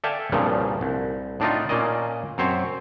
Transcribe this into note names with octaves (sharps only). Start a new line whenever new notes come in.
A4 D5 E5 F5 G5 G#5
C2 G2 A#2 C#3 F3
C2
A2 D4 D#4 F4
A#2 A#3 C#4 D5 D#5
F#2 C4 C5 C#5